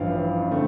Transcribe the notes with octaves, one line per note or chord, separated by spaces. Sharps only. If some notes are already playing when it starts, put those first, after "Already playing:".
Already playing: A1 G2 F3 F5
D3 A3 C4